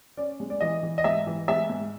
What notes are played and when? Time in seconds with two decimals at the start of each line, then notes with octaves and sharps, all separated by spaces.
0.17 C#4 D5
0.40 G#3
0.50 D5
0.60 E3 D#5
0.83 E3
0.98 D#5
1.04 G#2 E5
1.27 E3
1.48 G#3 E5
1.70 G#2